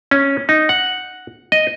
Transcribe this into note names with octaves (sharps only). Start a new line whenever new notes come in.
C#4
D#4
F#5
D#5